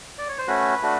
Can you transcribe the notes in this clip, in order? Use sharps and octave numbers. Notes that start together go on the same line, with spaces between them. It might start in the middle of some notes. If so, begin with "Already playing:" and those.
D5
C#5
C5
A3 C#4 F#4 B4
A3 D4 F#4